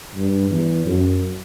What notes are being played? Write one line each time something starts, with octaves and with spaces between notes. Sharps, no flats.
G2
E2
F#2